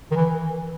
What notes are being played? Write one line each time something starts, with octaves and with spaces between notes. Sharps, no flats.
D#3
E3